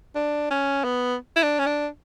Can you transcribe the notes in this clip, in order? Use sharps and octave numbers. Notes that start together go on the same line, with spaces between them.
D4
C#4
B3
E4
D4
C#4
D4